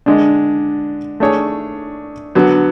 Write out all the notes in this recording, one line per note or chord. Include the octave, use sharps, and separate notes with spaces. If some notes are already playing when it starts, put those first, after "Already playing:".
D3 G#3 D4
A3 D4 G#4 C#5
D3 F#3 B3